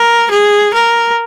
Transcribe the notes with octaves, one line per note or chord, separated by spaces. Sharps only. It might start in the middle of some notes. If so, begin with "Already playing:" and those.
Already playing: A#4
G#4
A#4